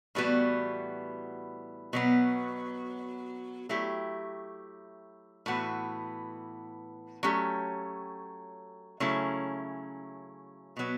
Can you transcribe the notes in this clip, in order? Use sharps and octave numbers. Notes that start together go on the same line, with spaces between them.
A2 E3 G3 B3 F#4
B2 F#3 B3
F#3 A3 E4 G4
A2 E3 B3 F#4
F#3 A3 C#4 G4
C#3 F#3 A3 C#4 E4
B2 F#3 B3